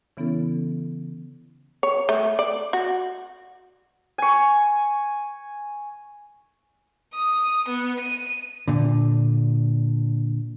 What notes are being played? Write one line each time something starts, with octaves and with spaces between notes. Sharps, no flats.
C#3 E3 B3 C#4 E4 A4
C#5
A3
D5
F#4
G#5 C#6
D#6
B3
D#7
A#2 D3